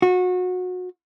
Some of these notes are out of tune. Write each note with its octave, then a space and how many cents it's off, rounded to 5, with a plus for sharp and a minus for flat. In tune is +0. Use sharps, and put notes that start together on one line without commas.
F#4 -25